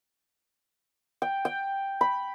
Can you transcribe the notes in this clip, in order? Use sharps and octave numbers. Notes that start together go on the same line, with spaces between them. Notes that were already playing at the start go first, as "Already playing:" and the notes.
G5
G5
B5